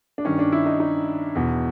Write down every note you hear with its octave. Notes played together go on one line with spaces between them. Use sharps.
D4
G2 D#3 C#4
D4
E4
D#4
D#4
E2 B2